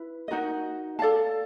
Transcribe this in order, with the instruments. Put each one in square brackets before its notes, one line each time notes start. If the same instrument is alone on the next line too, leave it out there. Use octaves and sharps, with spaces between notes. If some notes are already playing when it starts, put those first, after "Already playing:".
Already playing: [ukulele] E4 B4
D#4 F#4 A#4 D#5
A4 D5 F5 A5